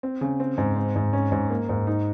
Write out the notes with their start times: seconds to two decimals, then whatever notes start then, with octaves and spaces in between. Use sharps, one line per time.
0.03 C4
0.21 C#3
0.40 C4
0.58 G#2
0.76 C4
0.96 G#2
1.13 C#4
1.32 G#2
1.50 A#3
1.69 G#2
1.87 D#4